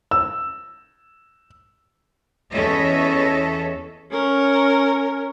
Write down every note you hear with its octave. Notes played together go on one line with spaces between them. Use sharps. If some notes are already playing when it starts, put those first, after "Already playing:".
E6
E2 C#4 A4 C#5 D#5 E5
C#4 A#4